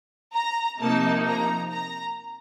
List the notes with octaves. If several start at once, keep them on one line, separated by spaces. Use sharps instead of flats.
A#5
C3 F3 A#3 D#4 A5
A#5
A#5